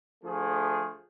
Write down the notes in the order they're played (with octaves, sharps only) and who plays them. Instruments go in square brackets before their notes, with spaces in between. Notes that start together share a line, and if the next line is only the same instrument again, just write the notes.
[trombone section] D2 F3 A3 G#4